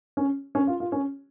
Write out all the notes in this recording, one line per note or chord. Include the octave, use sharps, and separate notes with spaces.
C#4
C#4
F4
F4
C#4